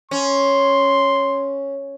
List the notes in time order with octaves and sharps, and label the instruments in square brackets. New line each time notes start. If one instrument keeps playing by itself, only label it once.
[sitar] C#4 [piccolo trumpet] C6